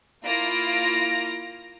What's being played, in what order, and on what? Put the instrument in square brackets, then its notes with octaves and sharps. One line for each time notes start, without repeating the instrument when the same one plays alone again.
[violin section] A#3 E4 F4 F6 A#6 D7